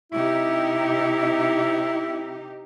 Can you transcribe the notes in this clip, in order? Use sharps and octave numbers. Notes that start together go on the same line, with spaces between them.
C3 D#4 E4 G4